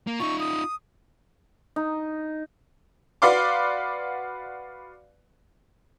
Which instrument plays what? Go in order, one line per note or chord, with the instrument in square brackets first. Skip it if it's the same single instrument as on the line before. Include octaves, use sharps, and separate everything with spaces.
[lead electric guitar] A#3
[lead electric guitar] D#4 F4 [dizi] C#6
[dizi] D#6
[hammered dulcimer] D#4
[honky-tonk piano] F#4 B4 D5 F5 C6 D6